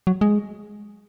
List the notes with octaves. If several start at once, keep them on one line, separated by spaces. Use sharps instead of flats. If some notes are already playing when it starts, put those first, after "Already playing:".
F#3
G#3